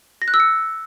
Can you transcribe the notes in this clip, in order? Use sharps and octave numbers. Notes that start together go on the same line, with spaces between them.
A#6
F#6
E6
C#7